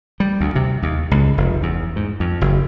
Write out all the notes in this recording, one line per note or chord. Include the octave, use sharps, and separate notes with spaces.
G3
D2
C3
D#2
C#2
F1
E2
G#2
F2
F#1